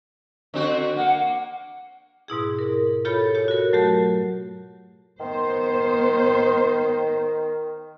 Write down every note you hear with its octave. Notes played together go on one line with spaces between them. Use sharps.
D3 C4 F#4
A#3 F#5
G#2 B2 E4 G#4
A#4
F4 G4 A4 C#5 B5
G4 C#5
F#4 A#4
F#3 A3 G4 A#4
D#3 B3 C5